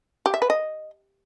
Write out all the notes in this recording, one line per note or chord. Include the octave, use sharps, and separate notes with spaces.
G4
E5
B4
D#5